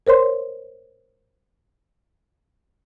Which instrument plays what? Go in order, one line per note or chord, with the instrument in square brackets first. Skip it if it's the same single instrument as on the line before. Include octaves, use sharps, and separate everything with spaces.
[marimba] A#4 C5 C#5 C6